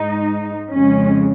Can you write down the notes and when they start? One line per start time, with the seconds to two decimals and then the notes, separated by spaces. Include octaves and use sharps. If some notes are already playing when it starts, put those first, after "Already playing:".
Already playing: G#2 G#3 D#4
0.72 F2 C#3 G#3 C#4